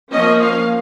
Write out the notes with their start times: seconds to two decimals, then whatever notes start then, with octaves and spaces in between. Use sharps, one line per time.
0.12 F3 A#3 C#4 D#5
0.41 F5